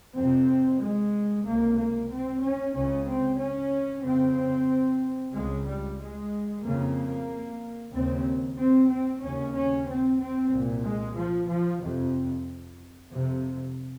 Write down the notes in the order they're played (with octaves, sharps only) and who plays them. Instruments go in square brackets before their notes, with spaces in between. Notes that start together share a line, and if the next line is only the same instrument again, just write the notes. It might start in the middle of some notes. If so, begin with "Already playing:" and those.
[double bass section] F2 C3 C4
G#3
C#2 C3 A#3
A#3
C4
C#4
C#2 C#3 C#4
C4
C#4
F2 C#3 C4
C#2 C#3 G#3
G3
G#3
F2 C#3 A#3
D#2 C#3 C4
C4
C4
D#2 C#3 C#4
C#4
C4
C4
C2 A#2
G#3
F3
F3
F2 C3
F2 C3